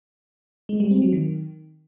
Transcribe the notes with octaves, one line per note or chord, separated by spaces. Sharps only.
G#3
G3
C4
F#3
D#3